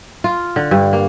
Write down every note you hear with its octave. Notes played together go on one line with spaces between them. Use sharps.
F4
D3
G2
A#3